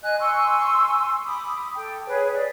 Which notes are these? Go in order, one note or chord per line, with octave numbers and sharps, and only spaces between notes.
D#5 G#5 F#6
G#5 C6 C#6 E6
B5 D6 D#6
A4 G5
G#4 B4 C#5
D5